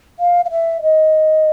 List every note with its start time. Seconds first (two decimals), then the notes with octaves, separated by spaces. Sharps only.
0.19 F5
0.45 F5
0.50 E5
0.82 D#5